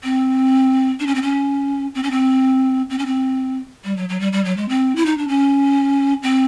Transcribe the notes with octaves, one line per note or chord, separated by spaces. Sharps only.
C4
D4
C#4
C4
C#4
C4
C#4
C4
C4
C#4
C4
G3
F#3
F#3
G3
G3
F#3
G#3
C4
E4
D#4
D4
C#4
C4